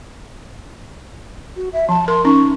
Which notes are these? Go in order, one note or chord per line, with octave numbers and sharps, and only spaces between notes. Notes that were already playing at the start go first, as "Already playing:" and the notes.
F#4
E5
F3 A5
A#4 C6
C#4 D#4 C#6